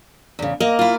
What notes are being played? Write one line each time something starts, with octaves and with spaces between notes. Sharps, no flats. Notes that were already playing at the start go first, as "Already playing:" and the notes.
E2 C#3
A#3 D#5
E4 F4